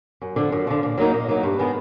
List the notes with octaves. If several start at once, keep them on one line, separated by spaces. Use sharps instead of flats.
F#2
D3 F3
F#2
D3 F3
A#2
F#3 A#3 D#4
A#2
F#3 A#3 D#4
G2
D#3 G#3 B3